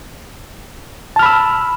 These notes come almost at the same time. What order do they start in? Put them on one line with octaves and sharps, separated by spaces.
A5 F6 B5 E6